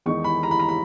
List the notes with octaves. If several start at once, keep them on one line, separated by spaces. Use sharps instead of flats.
E2 D#3 G#3 D#4 C#6
B5
A#5
B5
A#5
B5